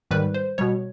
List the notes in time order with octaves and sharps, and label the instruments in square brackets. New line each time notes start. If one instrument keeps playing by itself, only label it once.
[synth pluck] G#2 D#3 G3 B4
C5
B2 G3 C#5